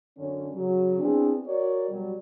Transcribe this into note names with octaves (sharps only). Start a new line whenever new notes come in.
F#2 D3 C#4
C#3 F#3
B3 C4 D4 E4 G#4
F#4 A#4 C#5 D5
B2 F#3 G3